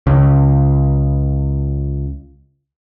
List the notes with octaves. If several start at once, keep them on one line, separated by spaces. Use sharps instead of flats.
C#2 C#3